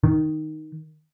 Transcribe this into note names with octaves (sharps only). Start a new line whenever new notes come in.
D#3